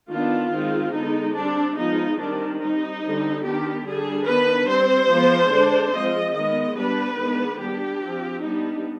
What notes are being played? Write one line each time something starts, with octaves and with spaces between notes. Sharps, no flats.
D#3 B3 D4 F4
D#3 G#3 C4
D3 G#3 B3 D#4
G3 C4 D4
F3 G#3 B3 D#4
D#3 G3 C4 D4
G3 C4 D#4
D3 G3 C4
D#3 B3 D4 G4
D3 G3 D4 G#4
D#3 B3 D4 B4
G3 C4 C5
F3 G#3 B3
D3 G#3 D4
F3 G#3 C4 D#5
D#3 G#3 B3 D#5
G3 B3 D4 B4
D#3 G#3 B3 D4
G3 B3 D4 G4
F3 C4
G3 B3 D4 D#4